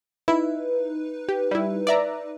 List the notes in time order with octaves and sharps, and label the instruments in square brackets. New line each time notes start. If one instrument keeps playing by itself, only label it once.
[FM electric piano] D#4 B4 [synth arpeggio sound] E4
[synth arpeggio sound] G4
G3 E4
D5 E5 A#5